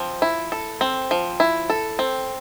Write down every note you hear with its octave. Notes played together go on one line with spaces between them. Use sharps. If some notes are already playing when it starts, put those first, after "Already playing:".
Already playing: F3 C4
E4
A4
C4
F3
E4
A4
C4